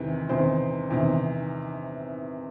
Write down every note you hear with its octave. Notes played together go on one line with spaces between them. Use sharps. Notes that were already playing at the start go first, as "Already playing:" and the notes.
Already playing: E2 C3 D#3 B4
E2 C3 D#3 C5
E2 C3 D#3